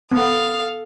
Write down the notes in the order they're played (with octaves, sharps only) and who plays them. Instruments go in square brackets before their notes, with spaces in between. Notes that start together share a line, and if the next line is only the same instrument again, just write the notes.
[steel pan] B3 [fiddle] A4 F5 [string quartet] D#6